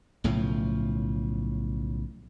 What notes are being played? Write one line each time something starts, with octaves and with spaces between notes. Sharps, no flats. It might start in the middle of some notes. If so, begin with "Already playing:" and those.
B1 A2 C#3 F3